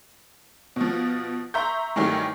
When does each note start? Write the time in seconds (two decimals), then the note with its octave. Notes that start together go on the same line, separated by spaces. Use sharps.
0.76 B2 F3
1.54 E5 A#5 C6 C#6 G6
1.96 G2 D#3 E3 F#3 G3 A3